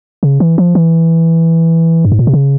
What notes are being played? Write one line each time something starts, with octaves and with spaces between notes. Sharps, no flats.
C#3
E3
F3
E3
G2
G#2
A#2
C3
C#3